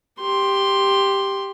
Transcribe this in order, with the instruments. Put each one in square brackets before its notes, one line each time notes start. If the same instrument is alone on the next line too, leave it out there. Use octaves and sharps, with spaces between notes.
[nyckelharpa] G4 C6